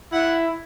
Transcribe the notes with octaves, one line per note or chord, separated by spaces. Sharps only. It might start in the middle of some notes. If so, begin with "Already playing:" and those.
E4 F#5